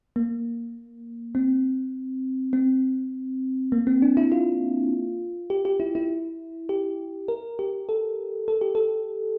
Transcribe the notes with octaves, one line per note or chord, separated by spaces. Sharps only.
A#3
C4
C4
A#3
C4
D4
E4
F4
G4
G4
E4
E4
G4
A#4
G4
A4
A4
G4
A4